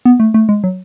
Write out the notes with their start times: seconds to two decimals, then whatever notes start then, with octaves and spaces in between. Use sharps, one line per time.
0.05 B3
0.20 A3
0.34 A3
0.49 G#3
0.64 F#3